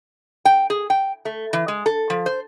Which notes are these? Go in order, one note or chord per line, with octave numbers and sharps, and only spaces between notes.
G5
G#4
G5
A3
E3
G#3
A4
F3
C5